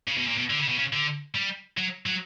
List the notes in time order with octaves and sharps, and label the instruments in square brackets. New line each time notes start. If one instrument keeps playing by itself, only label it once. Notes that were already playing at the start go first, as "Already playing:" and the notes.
[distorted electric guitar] C#3
B2
A#2
B2
D3
C#3
B2
C#3
D3
G3
F#3
F#3